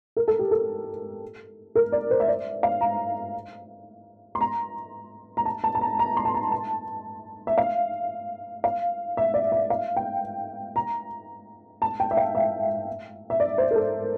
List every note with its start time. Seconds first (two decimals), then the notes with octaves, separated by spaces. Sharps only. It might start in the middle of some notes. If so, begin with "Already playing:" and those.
0.17 A#4
0.28 A4
0.39 G4
0.51 A4
1.75 A#4
1.92 D5
2.11 C5
2.20 E5
2.28 D5
2.63 F5
2.81 A#5
4.35 C6
4.41 A#5
5.37 A#5
5.45 A5
5.64 A5
5.75 A5
5.81 A#5
5.99 A#5
6.17 C6
6.25 A5
6.34 A#5
6.51 A5
7.47 E5
7.58 F5
8.64 F5
9.17 E5
9.34 D5
9.52 E5
9.70 F5
9.96 G5
10.76 A#5
11.82 A5
12.00 G5
12.11 E5
12.17 F5
12.35 E5
13.30 E5
13.40 D5
13.58 C5
13.71 A#4
13.76 A4